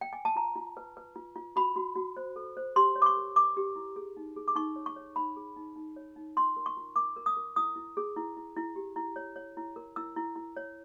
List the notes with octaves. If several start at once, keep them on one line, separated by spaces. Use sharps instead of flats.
G5
G#5
A5
F4 A#5
F4
B4
B4
F4
F4
F#4 B5
F#4
F#4
C5
A4
C5
G4 C6
C#5
D6
C#6
A#4
A#4 D6
G4
E4
G#4
D#4
G#4
D6
D#4 C#6
C#5
C#6
C#5
D#4 B5
G#4
D#4
D#4
C#5
D#4
F4 C6
A#4
C#6
F4
A#4 D6
A#4
D#6
A#4
E4 D#6
E4
G#4
E4
E4
E4
G4
E4
C#5
C#5
E4
A#4
E4 E6
E4
E4
C#5